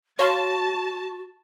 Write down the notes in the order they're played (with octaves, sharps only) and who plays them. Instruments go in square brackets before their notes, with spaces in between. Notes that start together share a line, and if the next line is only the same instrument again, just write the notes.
[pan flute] F#4 [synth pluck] C#5 F5 C6 [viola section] A5